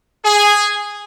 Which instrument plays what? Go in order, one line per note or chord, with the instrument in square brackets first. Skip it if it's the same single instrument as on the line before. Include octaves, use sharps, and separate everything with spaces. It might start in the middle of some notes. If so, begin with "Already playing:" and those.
[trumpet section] G#4